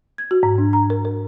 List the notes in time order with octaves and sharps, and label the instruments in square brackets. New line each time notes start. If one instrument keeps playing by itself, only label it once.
[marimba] G#6
F#4
G#2
D4
A#5
A#4
A#4